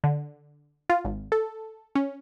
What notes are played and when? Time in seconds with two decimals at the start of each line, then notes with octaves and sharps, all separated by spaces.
0.04 D3
0.90 F4
1.05 G#1
1.32 A4
1.95 C#4